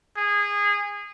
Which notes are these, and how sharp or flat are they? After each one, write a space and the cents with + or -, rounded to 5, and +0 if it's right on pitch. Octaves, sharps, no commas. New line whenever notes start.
G#4 -20